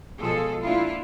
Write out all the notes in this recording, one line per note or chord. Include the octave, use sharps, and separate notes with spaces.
B2 F3 G#3 F4 G#4 A4
A#3 D4 E4 F4